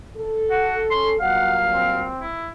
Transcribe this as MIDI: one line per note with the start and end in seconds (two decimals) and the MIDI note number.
0.17 1.18 69
0.50 0.83 66
0.50 0.77 78
0.91 1.15 61
0.91 1.10 84
1.20 2.08 43
1.20 2.08 46
1.20 2.08 54
1.20 2.04 77
1.20 1.57 78
1.71 2.28 60
2.21 2.50 64